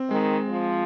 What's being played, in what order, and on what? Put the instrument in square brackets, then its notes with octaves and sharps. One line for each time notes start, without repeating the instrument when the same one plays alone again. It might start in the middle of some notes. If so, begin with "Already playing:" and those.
Already playing: [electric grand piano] C4
[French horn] D#3 [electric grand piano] G#3
[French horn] F3